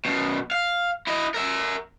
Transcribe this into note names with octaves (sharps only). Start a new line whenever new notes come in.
F#2 B2
F5
E4 D#5
A#4 E5